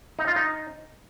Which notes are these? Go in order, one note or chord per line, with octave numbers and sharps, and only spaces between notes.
D#4
F4
D#4